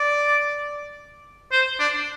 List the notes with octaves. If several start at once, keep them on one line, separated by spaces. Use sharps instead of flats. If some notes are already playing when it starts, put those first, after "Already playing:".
Already playing: D5
C5
D4